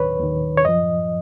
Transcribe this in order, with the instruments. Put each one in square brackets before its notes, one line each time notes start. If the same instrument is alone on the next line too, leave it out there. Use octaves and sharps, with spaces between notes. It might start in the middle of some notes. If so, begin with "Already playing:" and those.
Already playing: [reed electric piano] D#2 D#3 B4 C#5
D#2 D#3
C#5
F#2 F3 D#5